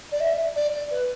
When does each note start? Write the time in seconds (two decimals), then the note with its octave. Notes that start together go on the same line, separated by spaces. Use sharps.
0.12 D5
0.21 E5
0.56 D5
0.91 B4